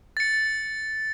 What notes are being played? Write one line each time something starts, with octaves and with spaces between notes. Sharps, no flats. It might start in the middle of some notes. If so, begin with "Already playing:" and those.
A6 C#7